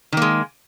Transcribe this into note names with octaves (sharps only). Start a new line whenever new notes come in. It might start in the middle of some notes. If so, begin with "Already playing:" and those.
D#3 G#3 A#3